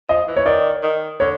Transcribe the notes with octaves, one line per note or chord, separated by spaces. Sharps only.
F3 D#5
E3
C#5
D#3 D5
D#3
D3 C#5